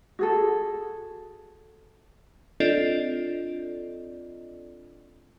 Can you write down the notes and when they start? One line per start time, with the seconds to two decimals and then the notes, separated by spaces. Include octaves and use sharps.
0.19 F#4 G#4 A4
2.60 C4 D4 F4 A4 D5 D#5